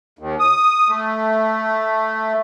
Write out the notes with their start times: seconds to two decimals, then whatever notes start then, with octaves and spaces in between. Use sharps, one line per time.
0.19 D#2
0.40 D#6
0.89 A3